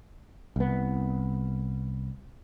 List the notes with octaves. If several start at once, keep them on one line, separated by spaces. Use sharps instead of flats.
C2 B3